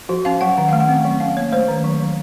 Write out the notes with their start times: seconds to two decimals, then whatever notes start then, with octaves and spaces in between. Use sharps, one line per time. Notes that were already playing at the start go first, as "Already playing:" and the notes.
0.09 F3 F#4
0.25 C#4 F5
0.41 F#3 F#5
0.58 D#3 F#5
0.69 A3 F5
0.80 F#5
0.89 C4
1.05 F#3
1.20 C#4 F5
1.36 A#3 C#5
1.52 A3 C5
1.68 D#3
1.84 F#3
2.00 F#3